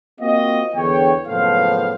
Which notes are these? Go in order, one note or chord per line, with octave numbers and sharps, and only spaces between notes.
A#3 C4 F4 F#4 D#5
E2 D3 C#5 G5
F#1 A2 F3 B3 C5 F5